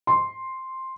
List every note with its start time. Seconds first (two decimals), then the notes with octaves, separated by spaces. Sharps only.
0.07 C6